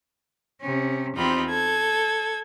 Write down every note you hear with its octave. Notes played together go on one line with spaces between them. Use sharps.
C3 C#4
E2 C4 D#4 F4 G4 B5
A4 G#6